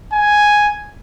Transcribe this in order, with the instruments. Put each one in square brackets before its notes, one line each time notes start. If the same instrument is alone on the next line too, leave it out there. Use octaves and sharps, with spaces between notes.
[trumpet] G#5